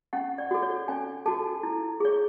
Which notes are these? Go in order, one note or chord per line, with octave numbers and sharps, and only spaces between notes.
C#4 F#5
D5
F#4 A4
C#5
C#4 G#5
F#4 A4 A5
E4
G#4 C#5